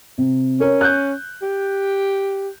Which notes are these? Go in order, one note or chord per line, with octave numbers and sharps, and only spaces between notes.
C3
C#4 A#4 C#5
F#6 G6
G4